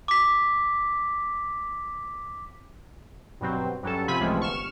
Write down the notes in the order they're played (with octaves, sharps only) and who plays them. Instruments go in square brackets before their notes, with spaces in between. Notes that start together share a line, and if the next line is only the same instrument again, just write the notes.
[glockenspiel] D6 B6
[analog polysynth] G2 B2 F#3 C4
G2 F#3 C#4 A4
C3 F3 C4 G#5 B5 B6
C#2 C3 E3 F3 G#3 A3
G1 C#6 F6 E7